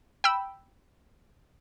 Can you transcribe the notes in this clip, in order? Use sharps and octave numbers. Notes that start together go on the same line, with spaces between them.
G5 B5 E6